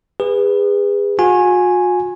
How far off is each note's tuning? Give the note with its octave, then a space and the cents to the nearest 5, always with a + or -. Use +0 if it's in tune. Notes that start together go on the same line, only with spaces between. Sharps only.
G#4 -35 B4 +0
F#4 -45 G#5 +0